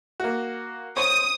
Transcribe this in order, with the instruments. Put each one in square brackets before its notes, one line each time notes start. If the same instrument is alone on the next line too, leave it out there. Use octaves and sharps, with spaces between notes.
[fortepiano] A#3 F#4
[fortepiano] C5 C#5 C#6 [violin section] D#6